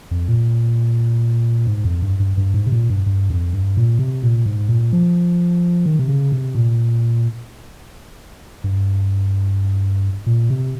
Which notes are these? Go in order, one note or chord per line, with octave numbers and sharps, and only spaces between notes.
F2
A#2
G#2
F2
G2
G2
G2
G#2
C3
A#2
G2
G2
F2
G2
A#2
C3
A#2
G#2
A#2
F3
D#3
C3
C#3
C3
A#2
G2
A#2
C3